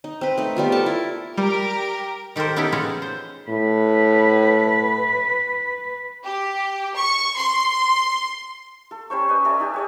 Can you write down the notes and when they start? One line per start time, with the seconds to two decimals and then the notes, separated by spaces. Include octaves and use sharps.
0.04 D#4
0.21 C4 B4
0.38 A3 D#4
0.57 G3 B3 F4
0.72 A4 A#4 A5
0.86 E4
1.37 G3 G4 A#4
2.36 D#3 G4 A4 A#4 C5
2.56 B3 C#4 D#4 E4 G4 A4
2.72 B3 C#4 F4 F#4 G#4 A4
3.02 C5
3.49 A2 B4
6.23 G4
6.96 C#6
7.36 C6
8.91 A4
9.10 G3 C#4 C5 C#6
9.28 C#4 B4 D#5
9.45 A4 D5 E5 G#5
9.60 D#4 G4
9.74 G#4 C#5 D#5